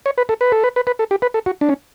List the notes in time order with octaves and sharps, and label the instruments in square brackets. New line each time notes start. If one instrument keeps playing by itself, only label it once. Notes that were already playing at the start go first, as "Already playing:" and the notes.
[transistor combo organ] C#5
B4
A4
B4
A4
B4
B4
B4
A4
G4
B4
A4
F#4
D4
C#4